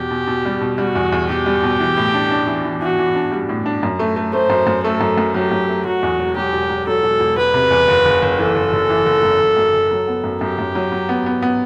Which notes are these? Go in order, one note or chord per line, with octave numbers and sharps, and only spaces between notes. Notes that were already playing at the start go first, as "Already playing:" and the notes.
Already playing: E2 B2 G4
B2
B2
G3
B2
G3 F#4
E2
E2
B2 G4
G3
B2
E3
A2
D4
D4
E3
E3
E3 F#4
E3
D4
G3
A2
D4
F#2
A3
A3
A3 C5
F#2
F#2
A3 A4
F#2
F#2
F#3 G4
F#2
A3
F#3 F#4
E2
E1
F#3 G4
E1
F#3
F#3 A4
E1
E1
E1 B4
C3
E2
F#1
F#1
F#1
E3 A4
F#1
F#1
E3
F#1
F#2
F#1
F#2
F#1
F#3
B3
F#2
F#2 G4
F#2
F#3
F#3
B3
B3
B3